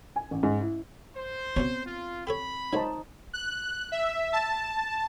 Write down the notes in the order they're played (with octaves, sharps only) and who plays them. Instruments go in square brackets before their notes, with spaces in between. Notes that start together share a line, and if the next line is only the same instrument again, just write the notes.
[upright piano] G#5
A1
G#2
E4
[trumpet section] C5
[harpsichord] B2 C#4 C#5 [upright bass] C4
[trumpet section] F4
[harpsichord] G4 A4 C#5 [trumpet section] B5
[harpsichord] F#3 G#3 [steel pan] D#4 C5 A5
[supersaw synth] F#6
E5
A5